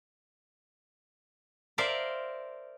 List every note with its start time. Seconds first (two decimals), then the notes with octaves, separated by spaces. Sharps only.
1.78 A#4 C5 D5 E5 F5